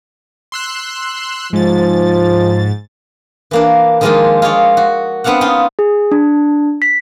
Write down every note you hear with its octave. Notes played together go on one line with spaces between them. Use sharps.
C6 E6 F#6
G#2 F3 A6
E3 A#3 D4
D#3 F3 G#3 A#3 D4 F4
F4 G#4 C#5 D5
F#4
B3 C4 D4 F5 F#5
C#4 D#4 F4
G#4
D4
B6